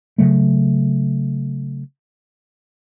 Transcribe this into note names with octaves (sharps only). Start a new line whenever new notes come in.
C#3 F#3 A3